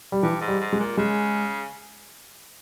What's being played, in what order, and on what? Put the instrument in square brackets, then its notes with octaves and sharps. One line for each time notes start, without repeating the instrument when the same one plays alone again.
[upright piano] G3
[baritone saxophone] G2 [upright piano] E3
[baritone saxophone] G#2
[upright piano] G3
[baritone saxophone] G#2
[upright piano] G#3
[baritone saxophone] A#2
[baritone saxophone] C#3 [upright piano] G#3